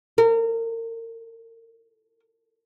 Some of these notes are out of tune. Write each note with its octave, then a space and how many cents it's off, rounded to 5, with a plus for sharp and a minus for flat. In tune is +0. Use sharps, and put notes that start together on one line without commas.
A#4 -35